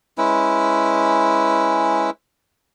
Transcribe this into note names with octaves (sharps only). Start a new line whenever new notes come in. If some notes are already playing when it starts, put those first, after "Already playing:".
G#3 C#4 E4 B4